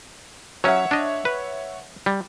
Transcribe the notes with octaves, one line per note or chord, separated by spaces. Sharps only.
F#3 C#4 C#5 E5 F#5
D4 D#5
B4
G3